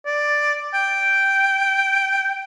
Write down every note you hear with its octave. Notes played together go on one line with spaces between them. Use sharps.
D5
G5